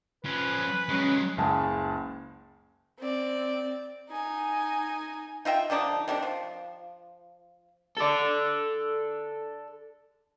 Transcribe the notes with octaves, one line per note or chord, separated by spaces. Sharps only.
F3 C#4 B4
F#3 G#3 C#4
F#1 C#2 G#4 A5
C4 D5
D#4 G#5
D#4 F4 E5 G5
D3 F3 D4 D#4
C3 D#3 G3 D4
F3
A4 D5